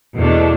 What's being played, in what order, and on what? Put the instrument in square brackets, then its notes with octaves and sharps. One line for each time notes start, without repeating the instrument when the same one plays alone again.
[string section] E2 B2 A3 D4